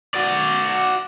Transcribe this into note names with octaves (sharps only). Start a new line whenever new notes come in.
F#4 D5